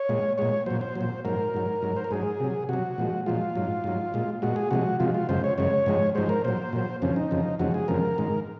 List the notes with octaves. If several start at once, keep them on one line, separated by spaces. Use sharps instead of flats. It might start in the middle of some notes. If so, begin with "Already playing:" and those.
Already playing: C#5
A#2 G#3
A#2 G#3 C#5
A#2 F#3 C5
C5
F#3
A#2
G#2 F#3 A#4
G#2 F#3
G#2 F#3
C5
A#4
G#2 F#3 G#4
C3 F#3
C3 F#3 F#4
A#2 F3 G#3
A#2 F3 G#3 F4
G#2 F#3
G#2 F#3
A#2 G#3
A#2 G#3 F#4
G#4
C3 F3 G#3 F#4
C3 F3 G#3 F4
F4
F#2 C#3 G#3 C5
C#5
F#2 C#3 G#3 C#5
G#2 F3 G#3
G#2 F3 G#3 C5
A#4
A#2 F#3 C5
A#2 F#3
F2 C#3 F3 C#4
D#4
F2 C#3 F3
F2 C#3 F3 G#3 F#4
G#4
F2 C#3 F3 G#3 A#4
G#2 D#3 G#3